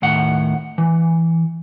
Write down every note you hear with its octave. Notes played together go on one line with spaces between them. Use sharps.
D#2 A2 F#5
E3